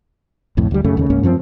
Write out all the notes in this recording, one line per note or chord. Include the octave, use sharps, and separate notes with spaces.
B1 F2 A2
D2 G3
F#2 C#3 A3
D#2 C#3
C#2 G#2 A#3 C#4
F#2 F3 A3 C4